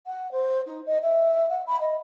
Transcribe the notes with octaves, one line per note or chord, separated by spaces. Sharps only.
F#5
C5
D#4
D#5
E5
F#5
B5
D#5